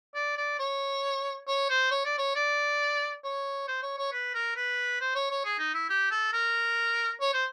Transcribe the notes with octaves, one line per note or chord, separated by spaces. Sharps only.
D5
D5
C#5
C#5
C5
C#5
D5
C#5
D5
C#5
C5
C#5
C#5
B4
A#4
B4
C5
C#5
C#5
G#4
D#4
E4
G4
A4
A#4
C#5
C5